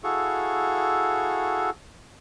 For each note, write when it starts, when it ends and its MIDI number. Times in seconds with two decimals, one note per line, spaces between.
0.04 1.70 64
0.04 1.70 66
0.04 1.70 68
0.04 1.70 69
0.04 1.70 77
0.04 1.70 85